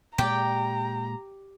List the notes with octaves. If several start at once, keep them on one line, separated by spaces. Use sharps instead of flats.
A#2 G#3 G4 D5 G5 A#5